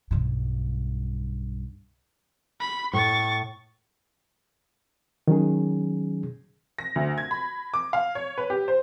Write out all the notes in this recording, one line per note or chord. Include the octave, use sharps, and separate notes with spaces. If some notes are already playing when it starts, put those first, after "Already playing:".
B1 G2
B5
A2 C#6 A6
D#3 F#3 C#4 G#4
A#6
D2
G#6
B5
D6
F5
C#5
B4
G4
C5